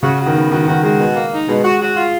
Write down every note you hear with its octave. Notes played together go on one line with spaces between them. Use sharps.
C#3 F#4
F#4
D#3
B3
D#3 F#4
D#3 F#4
G#3 F#4
B2
A#3
D#4
B2 G#3
F#4
F#4
F4